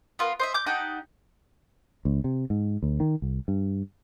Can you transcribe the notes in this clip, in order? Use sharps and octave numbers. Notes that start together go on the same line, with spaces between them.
B3 F4 A#4
C5 D#5 E5
D6 G6
D#4 G4 F#5 A5
C#2
C3
G#2
D2
D#3
C2
G2